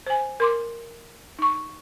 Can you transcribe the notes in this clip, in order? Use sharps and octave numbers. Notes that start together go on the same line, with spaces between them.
C5 G#5
A#4 C6 D6
D#4 C#6